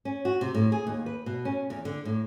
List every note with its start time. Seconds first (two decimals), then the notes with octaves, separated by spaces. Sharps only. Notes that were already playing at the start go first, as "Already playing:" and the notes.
0.05 C#4
0.25 F#4
0.41 C3
0.54 A2
0.72 G#4
0.87 D#2
1.06 B4
1.26 B2
1.45 C#4
1.70 E2
1.85 D3
2.05 A2